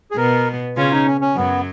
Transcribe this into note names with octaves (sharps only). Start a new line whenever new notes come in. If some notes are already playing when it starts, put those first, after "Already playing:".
G#4
B2 B3 A#4
C#3 C#4 F4
D#4
C#4
C#4
F#2 F#3 B3